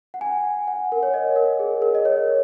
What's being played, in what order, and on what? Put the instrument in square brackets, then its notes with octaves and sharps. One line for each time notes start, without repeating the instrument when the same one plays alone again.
[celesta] F#5
G#5
F#5
A#4
C#5
D#5
A#4
G#4
A#4
D#5
C#5